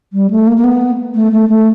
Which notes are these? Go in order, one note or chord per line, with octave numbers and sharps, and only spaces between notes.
G3
A3
A#3
A#3
B3
A3
A3
A3